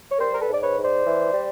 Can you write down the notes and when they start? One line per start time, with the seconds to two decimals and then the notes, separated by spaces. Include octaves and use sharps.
0.10 C#5
0.19 G3 A#4 C5
0.34 A#4
0.40 A4 B4
0.48 G#2 D5
0.62 B4 C#5
0.77 G#2
0.83 C5 D5
1.05 E3
1.33 G3